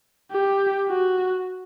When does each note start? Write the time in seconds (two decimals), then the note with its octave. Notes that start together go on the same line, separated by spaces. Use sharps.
0.32 G4
0.89 F#4